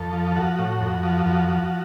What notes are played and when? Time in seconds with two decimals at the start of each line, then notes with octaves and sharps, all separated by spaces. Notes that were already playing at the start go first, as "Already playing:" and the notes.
Already playing: F2 A4
0.13 F3
0.36 F3 F#4
0.59 A2
0.81 F2
1.03 F3
1.26 F2 F#4
1.49 F3